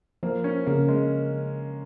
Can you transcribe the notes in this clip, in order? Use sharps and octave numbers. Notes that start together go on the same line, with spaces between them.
F3 A#3
C#4
C#3 A#3
G#3